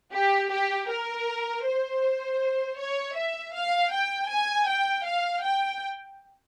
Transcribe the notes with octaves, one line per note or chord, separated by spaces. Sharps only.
G4
G4
A#4
C5
C#5
E5
F5
G5
G#5
G5
F5
G5